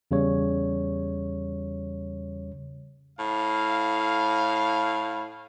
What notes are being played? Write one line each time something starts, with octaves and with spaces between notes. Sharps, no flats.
E2 C#3 G3 C#5
A2 F5